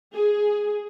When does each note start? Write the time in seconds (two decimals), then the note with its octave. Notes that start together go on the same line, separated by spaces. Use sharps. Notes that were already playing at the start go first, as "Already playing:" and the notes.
0.15 G#4